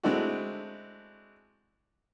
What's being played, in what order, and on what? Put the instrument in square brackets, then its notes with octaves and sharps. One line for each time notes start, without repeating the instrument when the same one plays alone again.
[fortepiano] G#3 A3 C4 D4 E4 F#4